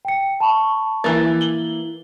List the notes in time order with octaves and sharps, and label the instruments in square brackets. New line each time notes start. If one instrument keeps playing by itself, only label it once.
[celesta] G5 C#7
A5 B5 C#6
[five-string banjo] E3 A#3 [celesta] A6
[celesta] F#7 G7